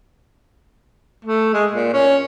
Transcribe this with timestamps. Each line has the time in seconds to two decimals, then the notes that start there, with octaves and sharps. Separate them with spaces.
1.25 A3
1.53 G#3
1.73 A#2
1.94 C#4